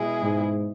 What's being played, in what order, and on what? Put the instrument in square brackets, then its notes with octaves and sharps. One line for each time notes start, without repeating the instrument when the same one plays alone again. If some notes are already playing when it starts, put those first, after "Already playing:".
Already playing: [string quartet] B2 G#3 E4 G#4
[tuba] G#2